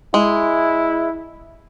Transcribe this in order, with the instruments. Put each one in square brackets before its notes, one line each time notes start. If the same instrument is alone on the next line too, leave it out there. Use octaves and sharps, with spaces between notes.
[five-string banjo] G#3 [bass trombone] E4